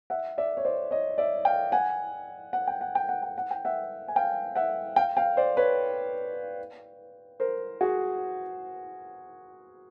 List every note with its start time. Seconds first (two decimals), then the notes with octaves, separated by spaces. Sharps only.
0.10 E5 F#5
0.38 D5 E5
0.57 C#5
0.65 C5 D5
0.91 C#5 D#5
1.18 D5 E5
1.45 F5 G5
1.72 F#5 G#5
2.53 F#5
2.67 G5
2.81 F#5
2.95 G5
3.09 F#5
3.23 G5
3.38 F#5
3.51 G5
3.65 E5 F#5
4.08 G#5
4.16 F5 G5
4.56 E5 F#5
4.96 F5 G5
5.17 F5 G5
5.37 C5 D5
5.57 B4 C#5
7.40 A#4 C5
7.81 F#4 G#4